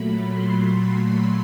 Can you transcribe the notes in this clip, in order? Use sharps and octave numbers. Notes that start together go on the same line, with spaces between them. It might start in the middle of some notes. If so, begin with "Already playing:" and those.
Already playing: A#2 F#3 A3 B5
C6
B5